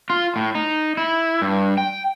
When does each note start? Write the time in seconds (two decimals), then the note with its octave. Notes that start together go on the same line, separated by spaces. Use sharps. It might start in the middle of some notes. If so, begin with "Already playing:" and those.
0.10 F4
0.36 A2
0.55 D#4
0.97 E4
1.41 G2
1.78 G5